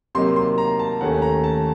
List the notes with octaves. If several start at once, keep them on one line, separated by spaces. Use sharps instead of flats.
C3 F#3 A#3 D#4 C6
C6
A#5
A5
D#2 D#3 A3 C#4 F#5
A#5
A5